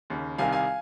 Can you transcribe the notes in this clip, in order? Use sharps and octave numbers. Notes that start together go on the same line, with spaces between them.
D#2 C#3
C2 C3 D#3 F5 G#5
F5 G#5